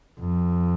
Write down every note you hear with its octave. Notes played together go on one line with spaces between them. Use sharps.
F2